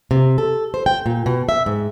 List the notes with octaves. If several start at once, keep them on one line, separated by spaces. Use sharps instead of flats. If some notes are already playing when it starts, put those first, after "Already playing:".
C3
A4
C5
G5
A#2
B2
E5
G#2